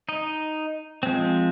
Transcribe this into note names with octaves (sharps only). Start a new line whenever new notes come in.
D#4 D#5
F3 G#3 C4